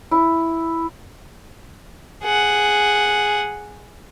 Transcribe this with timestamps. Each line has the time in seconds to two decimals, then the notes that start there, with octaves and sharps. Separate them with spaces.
0.11 E4
2.24 G#4 F#5